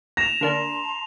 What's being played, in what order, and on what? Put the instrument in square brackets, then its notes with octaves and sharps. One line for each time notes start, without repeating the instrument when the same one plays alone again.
[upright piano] A#6 [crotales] E7 F7
[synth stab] D3 A#3 D4 [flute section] A5 A#5 C6